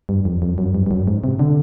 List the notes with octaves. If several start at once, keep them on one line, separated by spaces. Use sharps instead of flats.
G2
F2
F2
F#2
G2
G2
F#2
G#2
C3
D3